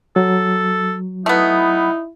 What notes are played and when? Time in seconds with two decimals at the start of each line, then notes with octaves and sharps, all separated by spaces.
0.16 F#3 A4
1.26 A3 B3 D#4 E4